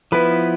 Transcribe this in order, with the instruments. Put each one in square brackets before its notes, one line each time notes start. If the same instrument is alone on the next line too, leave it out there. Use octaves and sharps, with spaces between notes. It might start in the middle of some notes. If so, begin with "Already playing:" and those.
[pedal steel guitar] F3 B3 E4 [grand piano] B4